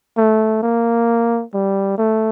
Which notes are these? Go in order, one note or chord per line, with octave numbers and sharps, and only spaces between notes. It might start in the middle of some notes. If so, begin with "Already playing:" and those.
A3
A#3
G3
A3